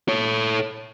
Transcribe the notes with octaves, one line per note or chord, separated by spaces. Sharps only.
A4 C#5